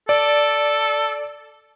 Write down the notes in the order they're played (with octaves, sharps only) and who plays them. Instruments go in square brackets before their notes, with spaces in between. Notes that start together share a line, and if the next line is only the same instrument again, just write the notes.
[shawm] A4 [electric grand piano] D5